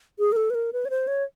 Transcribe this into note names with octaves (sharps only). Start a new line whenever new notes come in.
G#4
A#4
A4
B4
A#4
B4
C#5
C5
C#5